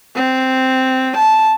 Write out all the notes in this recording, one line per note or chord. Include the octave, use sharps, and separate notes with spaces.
C4
A5